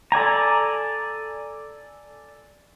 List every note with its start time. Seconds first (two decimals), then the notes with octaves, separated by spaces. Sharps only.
0.12 A4 D5 G#5 A#5